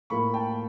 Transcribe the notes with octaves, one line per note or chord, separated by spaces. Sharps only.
A2 F3 A#3 B5 C#6
G5 A5